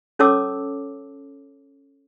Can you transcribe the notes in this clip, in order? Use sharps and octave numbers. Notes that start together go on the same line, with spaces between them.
C#4 A4 C#5 A5 D6 E6